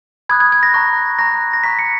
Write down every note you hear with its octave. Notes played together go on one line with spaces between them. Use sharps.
B5 D#6 F#6 G#6
G#6
G#6
A#6
A#5 C#6 F#6 A#6
A#5 C#6 F#6 A#6
A#6
A#5 C#6 F#6 B6
C#7